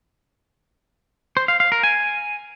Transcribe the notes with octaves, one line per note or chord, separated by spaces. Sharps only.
C5
F5
F5
A#4
G#5